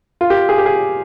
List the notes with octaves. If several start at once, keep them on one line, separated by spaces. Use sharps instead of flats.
F4
G4
G#4
G4
G#4